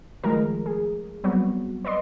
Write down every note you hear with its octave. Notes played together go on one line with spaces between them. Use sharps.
D#3 F3 G#3 A3 A#4
G#4
F#3 G3 B3 C4 F#4
B4 D5 D#5 C6